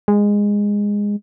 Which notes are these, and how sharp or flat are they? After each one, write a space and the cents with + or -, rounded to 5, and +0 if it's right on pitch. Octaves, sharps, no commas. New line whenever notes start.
G#3 -15